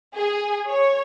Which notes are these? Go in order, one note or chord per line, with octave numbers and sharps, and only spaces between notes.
G#4
C#5